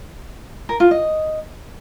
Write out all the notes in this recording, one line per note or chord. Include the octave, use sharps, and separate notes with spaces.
A#4
F4
D#5